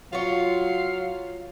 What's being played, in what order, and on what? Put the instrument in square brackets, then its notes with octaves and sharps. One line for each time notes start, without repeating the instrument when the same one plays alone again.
[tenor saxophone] F#3 [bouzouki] F4 C#5 [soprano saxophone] F5